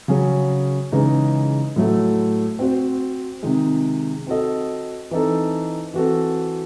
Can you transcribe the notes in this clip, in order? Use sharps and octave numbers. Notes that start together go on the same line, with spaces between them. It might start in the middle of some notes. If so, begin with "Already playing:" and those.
C#3 F#3 C#4 G#4
C#3 E3 G#3 D#4
A2 F#3 A3
C4 F#4 C5
C3 D#3 G#3
C4 F#4 A4 D#5
E3 C4 D#4 A4
E3 C4 F#4 A4